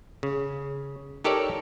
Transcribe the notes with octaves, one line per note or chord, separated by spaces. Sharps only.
C#3
D#4 G4 A4 A#4 C#5 D5